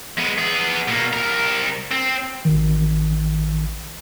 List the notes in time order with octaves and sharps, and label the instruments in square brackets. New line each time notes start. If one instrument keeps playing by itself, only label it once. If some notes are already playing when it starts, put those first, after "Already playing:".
[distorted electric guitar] G#3 B3
B3 G#4
B2 A#3
C2 A#4
C4
[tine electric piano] A1 D#3